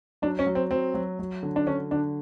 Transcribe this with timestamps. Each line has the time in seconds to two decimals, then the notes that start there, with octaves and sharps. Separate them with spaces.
0.22 F#3 D4
0.39 C#4
0.47 F#3
0.55 C4
0.71 F#3 C4
0.94 F#3
1.19 F#3
1.43 D3
1.56 D4
1.66 D3 C#4
1.91 D3 D4